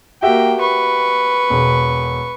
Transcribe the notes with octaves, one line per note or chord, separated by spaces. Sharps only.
A#3 F#4 G4 E5 G5
B4 C#6
E1